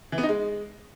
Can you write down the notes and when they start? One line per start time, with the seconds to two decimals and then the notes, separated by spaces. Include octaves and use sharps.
0.12 E3
0.18 B3
0.23 D#4
0.29 G#3